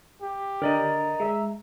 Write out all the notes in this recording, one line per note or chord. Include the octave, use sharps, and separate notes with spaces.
G4
D3 A#4 D5 D#5 A#5
G#3 E5